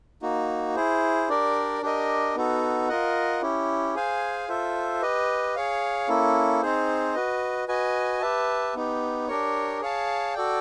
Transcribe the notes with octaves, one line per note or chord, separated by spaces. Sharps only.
A#3 D#4 F#4
E4 G#4 C5
D4 G4 A#4 D5
D4 G4 A#4 D#5
B3 D#4 F#4 A4
F4 A#4 D#5 F#5
C#4 E4 G4
G#4 C5 F5 G#5
F4 A4 C5 E5
G4 B4 D#5
G#4 C#5 F5
A#3 C#4 E4 A4
C4 D#4 G#4 C5
F#4 B4 D#5
F#4 B4 D#5 G#5
G4 B4 E5 A5
B3 D#4 G4
D4 G4 A#4 C#5
G#4 C#5 F5 A5
F#4 A4 D5 G5